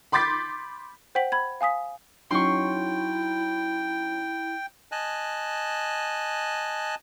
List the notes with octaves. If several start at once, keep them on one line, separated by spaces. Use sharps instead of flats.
B5 C6 D6 G6 A6 B6
C5 F#5 G5 B6 F#7
B5 G#6
F5 G#5 D#6 B6
F#3 C#4 D#4 E4 G5 C6 C#6
D#5 G#5 A5 F#6